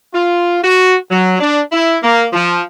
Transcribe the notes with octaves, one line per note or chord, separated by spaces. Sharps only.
F4
F#4
F#3
D4
E4
A#3
F3